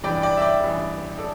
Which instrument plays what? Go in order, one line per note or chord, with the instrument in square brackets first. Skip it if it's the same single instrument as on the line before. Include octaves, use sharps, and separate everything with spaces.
[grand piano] A1 G2 E3 D5 G5
D5 G5
E5
D5 G5
A1 G2 E3
A4 D5